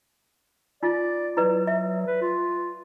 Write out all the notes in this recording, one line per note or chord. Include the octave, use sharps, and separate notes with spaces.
D#4 F4 D5
F#3 E4 B4 D5
E5
B4
F4